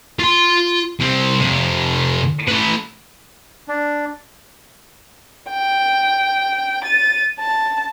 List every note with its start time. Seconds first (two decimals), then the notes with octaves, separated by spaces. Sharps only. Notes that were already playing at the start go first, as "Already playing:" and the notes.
0.19 F4 C6
1.00 C2 C4
1.40 F2 C3
2.48 A3 B4
3.68 D4
5.50 G5
6.84 A6 D#7
7.40 A5